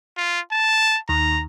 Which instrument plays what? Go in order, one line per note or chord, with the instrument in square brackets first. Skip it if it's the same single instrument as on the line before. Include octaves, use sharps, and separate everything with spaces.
[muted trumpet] F4
A5
[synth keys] D#2 [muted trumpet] A#5